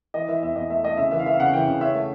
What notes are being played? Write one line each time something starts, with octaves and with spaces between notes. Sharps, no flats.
E3 D#5
E3 E5
E2 E5
E2 D#5
A3 E5
A3 D#5
C#3 E5
E3 E5
F5
E3 E5
F5
C#3 F#5
E3 G5
C#3
C#4 E5
A3